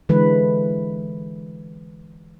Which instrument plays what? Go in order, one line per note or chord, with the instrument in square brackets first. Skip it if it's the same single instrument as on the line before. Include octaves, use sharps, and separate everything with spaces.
[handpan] D3 E3 G#3 B4